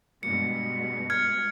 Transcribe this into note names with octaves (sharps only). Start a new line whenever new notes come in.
G2 B2 G#3 C#7
F6 G#6 C#7